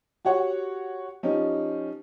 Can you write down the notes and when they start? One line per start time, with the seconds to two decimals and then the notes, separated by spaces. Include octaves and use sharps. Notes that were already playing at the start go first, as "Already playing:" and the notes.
0.25 F#4 G4 C#5 F#5
1.23 F3 C#4 D#4 G4